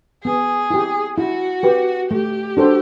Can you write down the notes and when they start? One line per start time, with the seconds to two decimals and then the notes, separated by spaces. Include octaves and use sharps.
0.24 B3 G#4
0.70 E4 G4
1.18 E4 F#4
1.63 G4 B4
2.11 A3 G4
2.57 D4 F#4 A4 C5